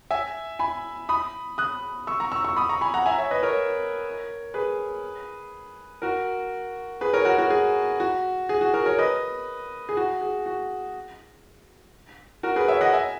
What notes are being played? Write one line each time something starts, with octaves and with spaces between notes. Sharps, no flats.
E5 G#5
G#5 B5
B5 D#6
D#6 F#6
C#6 E6
A#5 C#6
C#6 E6
C#6 E6
B5 D#6
A#5 C#6
G#5 B5
F#5 A#5
E5 G#5
C#5 E5
B4 D#5
A#4 C#5
G#4 B4
F#4 A#4
G#4 B4
A#4 C#5
F#4 A#4
F#4 A#4
G#4
F#4
G#4
F#4
F#4 A#4
A#4 C#5
B4 D#5
G#4
F#4
G#4
F#4
F#4 A#4
G#4 B4
C#5 E5
D#5 F#5
E5 G#5